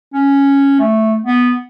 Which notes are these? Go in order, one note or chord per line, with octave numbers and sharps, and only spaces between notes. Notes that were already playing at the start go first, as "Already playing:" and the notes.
C#4
A3
B3